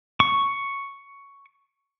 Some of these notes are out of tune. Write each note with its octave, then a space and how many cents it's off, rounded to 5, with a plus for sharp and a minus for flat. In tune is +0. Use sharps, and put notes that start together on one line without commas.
C#6 +5